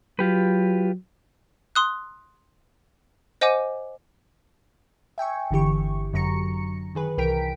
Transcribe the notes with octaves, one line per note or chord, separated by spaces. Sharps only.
F#3 F4 G4 B4
C6 D#6 F#6
C5 D#5 F#5 G#5 D6 D#7
E5 G5 G#5 C#6
G1 D3 E3 G4 C#6
F#2 D3 F#3 A#5 C#6 C#7
D#3 G#4 B4
C2 E3 A#4 G5 B6 D7